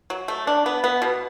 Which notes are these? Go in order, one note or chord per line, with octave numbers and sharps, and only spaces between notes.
F#3
A3
D4
B3
B3
B2